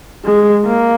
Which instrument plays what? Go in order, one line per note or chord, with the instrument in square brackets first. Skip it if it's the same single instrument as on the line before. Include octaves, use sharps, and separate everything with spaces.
[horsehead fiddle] G#3
A#3